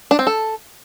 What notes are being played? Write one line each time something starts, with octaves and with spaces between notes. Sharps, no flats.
D4
C4
A4